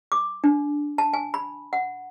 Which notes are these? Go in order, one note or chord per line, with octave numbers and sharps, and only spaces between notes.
D6
D4
A5
G#5
B5
F#5